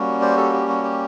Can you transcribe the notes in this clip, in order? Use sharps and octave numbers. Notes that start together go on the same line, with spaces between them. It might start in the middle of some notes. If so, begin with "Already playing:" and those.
Already playing: G3 A#3 C#4 F#4
C5 D5
G4 A4
G4
F#4
G4